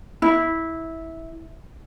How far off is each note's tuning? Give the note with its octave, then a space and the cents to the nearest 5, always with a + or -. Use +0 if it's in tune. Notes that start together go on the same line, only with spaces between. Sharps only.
E4 -15